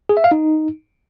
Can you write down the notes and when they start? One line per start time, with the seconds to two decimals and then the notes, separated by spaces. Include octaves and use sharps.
0.09 G#4
0.17 E5
0.24 F5
0.31 D#4